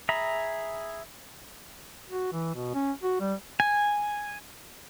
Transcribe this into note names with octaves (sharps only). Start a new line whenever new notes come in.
G#4 E5 A#5 B5
F#4
E3
B2
C#4
F#4
G3
G#5